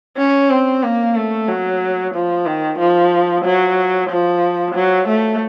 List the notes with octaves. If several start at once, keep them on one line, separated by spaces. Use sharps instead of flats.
C#4
C4
A#3
A3
F#3
F3
D#3
F3
F#3
F3
F#3
A3